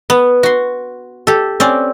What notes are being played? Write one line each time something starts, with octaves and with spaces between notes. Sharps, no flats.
B3
F#4 C6
G4 A4
C4 C#4 D5